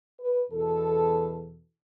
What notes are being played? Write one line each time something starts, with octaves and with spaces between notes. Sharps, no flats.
B4
E2 B2 A4